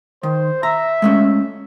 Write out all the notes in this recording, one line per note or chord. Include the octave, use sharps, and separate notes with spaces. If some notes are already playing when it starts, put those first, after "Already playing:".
D#3 C5
E5 A#5
G#3 A3 C#4